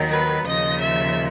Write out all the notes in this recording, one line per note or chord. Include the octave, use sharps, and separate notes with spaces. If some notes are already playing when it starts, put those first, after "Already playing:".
Already playing: D#2 D#3 F#3
B4
D#2 C#3 F3 D#5
E5